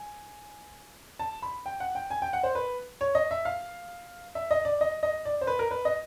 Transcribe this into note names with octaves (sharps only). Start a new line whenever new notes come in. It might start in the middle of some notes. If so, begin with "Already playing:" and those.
Already playing: G#5
A5
B5
G5
F#5
G5
G#5
G5
F#5
C5
B4
C#5
D#5
E5
F5
E5
D#5
D5
D#5
D#5
D5
C5
B4
A#4
B4
D#5